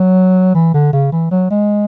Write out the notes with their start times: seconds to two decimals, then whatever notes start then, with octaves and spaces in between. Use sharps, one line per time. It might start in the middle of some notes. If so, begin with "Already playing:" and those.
Already playing: F#3
0.55 E3
0.74 D3
0.93 C#3
1.12 E3
1.31 F#3
1.51 G#3